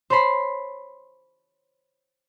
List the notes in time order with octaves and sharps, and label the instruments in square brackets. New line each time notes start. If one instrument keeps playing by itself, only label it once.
[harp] C5 C#5 A5 B5 C6